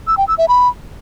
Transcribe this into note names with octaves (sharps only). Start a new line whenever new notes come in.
E6
G5
E6
E5
B5